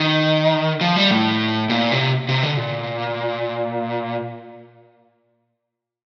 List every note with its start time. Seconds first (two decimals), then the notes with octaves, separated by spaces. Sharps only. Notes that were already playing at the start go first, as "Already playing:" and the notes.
Already playing: D#3
0.81 F3
0.96 G3
1.11 A2
1.70 A#2
1.92 C3
2.29 C3
2.43 D3
2.57 A#2